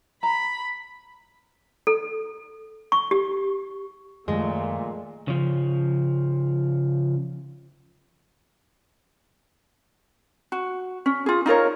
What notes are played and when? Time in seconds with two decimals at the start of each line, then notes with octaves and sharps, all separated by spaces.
0.23 A#5 B5
1.87 A4
2.92 C#6
3.11 G4
4.28 F#2 A#2 D#3 F3 G#3 A3
5.28 C#3 F3
10.52 F#4
11.06 C#4
11.26 F4 G#4
11.46 D#4 F4 A#4 C#5